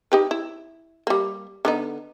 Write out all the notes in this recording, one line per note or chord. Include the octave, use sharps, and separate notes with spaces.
D#4 G4 B4
E4
G3 A#3
D3 B3 D#4